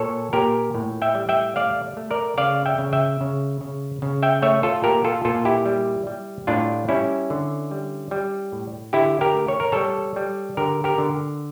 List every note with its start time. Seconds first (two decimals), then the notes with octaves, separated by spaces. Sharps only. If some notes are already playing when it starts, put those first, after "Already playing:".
Already playing: A#2 A4 C#5
0.33 A#2 G4 A#4
0.75 A2
1.02 E5 G5
1.15 G3
1.29 E5 G5
1.56 A3 D5 F5
1.97 A3
2.11 A#4 D5
2.38 C#3 D5 F5
2.66 E5 G5
2.79 C#3
2.93 E5 G5
3.21 C#3
3.61 C#3
4.02 C#3
4.23 E5 G5
4.42 A3 C#5 E5
4.63 F4 A4
4.84 A#2 G4 A#4
5.04 F4 A4
5.25 A#2 F4 A4
5.45 E4 G4
5.66 G3
6.07 G3
6.47 A2 D4 F4
6.89 G3 C#4 E4
7.30 D3
7.71 G3
8.11 G3
8.52 A2
8.93 D3 E4 G4
9.21 G4 A#4
9.34 A3
9.48 C#5
9.60 A#4
9.72 G3 A4 C#5
10.16 G3
10.57 D3 G4 A#4
10.84 G4 A#4
10.98 D3